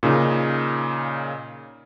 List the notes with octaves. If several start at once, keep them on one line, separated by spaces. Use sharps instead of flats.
A#2 C#3 D#4